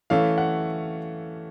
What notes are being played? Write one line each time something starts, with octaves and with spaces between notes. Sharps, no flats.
E3 A3 C#4 F5
F#5